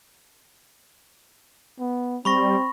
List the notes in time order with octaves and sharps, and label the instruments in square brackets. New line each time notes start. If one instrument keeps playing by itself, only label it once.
[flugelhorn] B3
[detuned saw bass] G3 [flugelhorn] C4 [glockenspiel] B5 C#6 A#6